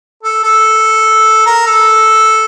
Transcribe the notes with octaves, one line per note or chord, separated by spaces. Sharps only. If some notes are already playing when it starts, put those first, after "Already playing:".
A4
A4
A#4
A4